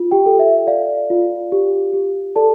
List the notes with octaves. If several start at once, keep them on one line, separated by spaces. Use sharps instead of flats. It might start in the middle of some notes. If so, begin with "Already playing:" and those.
Already playing: F4
G4 G5
A4
E5
D5 F5
F4
G4
G4
A4 D5 A5